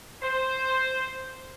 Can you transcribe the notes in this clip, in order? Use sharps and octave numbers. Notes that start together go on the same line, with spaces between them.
C5